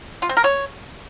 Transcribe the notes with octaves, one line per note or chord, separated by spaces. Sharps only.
F4
C4
A#4
C#5